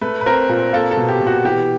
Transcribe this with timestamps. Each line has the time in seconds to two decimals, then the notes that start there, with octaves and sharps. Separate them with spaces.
0.01 A3 B4
0.21 B4
0.26 C4 A#4
0.49 A#2
0.73 A#3 A4
0.91 A4
0.97 B2
1.09 G4
1.21 B2
1.27 F#4
1.44 E3 G4